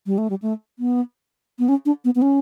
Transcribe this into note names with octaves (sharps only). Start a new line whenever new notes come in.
G3
A3
G3
A3
B3
B3
C#4
D4
B3
B3
C#4